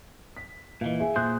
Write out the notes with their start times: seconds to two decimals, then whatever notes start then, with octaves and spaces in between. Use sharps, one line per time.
0.37 B6
0.81 A#2 E3 D#5 F5
1.00 G#4 E5 G#5
1.16 A#2 G#4 C5 F#6